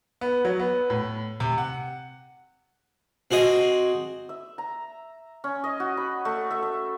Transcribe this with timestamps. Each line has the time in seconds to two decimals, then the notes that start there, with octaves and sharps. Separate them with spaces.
0.21 B3
0.45 F#3
0.59 B3
0.90 A2
1.40 C3
1.58 F#5
3.31 C4 F#4 G#4 D#5
4.29 E5
4.58 A#5
5.44 C#4
5.64 D#5
5.80 F#4
5.97 B5
6.25 A3
6.51 E5
6.63 E5